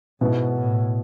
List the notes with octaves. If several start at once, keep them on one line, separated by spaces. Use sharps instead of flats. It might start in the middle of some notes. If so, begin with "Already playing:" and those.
G#2 B2 B3 E4
A2